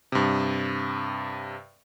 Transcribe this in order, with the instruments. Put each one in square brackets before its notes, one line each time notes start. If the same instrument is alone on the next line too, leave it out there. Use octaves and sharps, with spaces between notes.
[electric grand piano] G2 C3